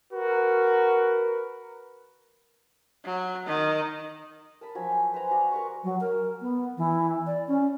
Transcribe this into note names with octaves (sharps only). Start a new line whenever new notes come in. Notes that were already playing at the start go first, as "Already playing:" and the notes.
F#4 A#4 B4
F#3
D#3
A#4 A5 B5
F3 F#3 G#5
G5
B4 C5 G#5 A#5
F#4 D5 F#5
A#4 B4 C#6
F#3
A#4
B3
E3
D5
C#4